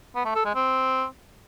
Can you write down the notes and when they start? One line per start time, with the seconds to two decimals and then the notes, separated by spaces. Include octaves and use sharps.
0.15 B3
0.25 A3
0.35 A4
0.45 G#3
0.55 C4